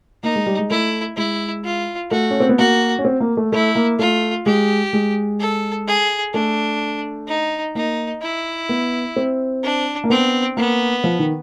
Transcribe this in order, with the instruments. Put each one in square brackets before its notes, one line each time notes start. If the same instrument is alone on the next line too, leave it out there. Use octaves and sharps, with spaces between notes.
[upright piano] A#3 [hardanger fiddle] D#4
[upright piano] G#3
G3
G#3
[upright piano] A3 [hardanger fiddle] E4
[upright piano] G#3 [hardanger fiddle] E4
[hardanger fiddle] F4
[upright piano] A3 [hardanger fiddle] F#4
[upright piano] C#4
C4
B3
[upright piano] A#3 [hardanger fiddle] F#4
[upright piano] C#4
C4
A#3
A3
[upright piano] A3 [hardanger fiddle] E4
[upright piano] A#3
[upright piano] A3 [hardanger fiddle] F4
[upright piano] G#3 [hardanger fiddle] G4
[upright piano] G#3
[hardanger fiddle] A4
G#4
[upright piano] A3 [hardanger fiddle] D4
[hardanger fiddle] D#4
[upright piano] A#3 [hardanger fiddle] D#4
[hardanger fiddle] E4
[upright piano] B3
C4
[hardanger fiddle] D4
[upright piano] A#3
[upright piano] B3 [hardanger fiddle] C4
[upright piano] A#3 [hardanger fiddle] B3
[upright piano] F3
D#3